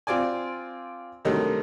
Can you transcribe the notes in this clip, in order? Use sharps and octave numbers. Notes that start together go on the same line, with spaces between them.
C4 F4 D5 G#5
G2 C3 D#3 F#3 A3 D#4